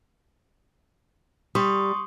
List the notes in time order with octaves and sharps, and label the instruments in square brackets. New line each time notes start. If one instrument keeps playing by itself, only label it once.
[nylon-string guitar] G3 [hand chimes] C6 C#6 D#6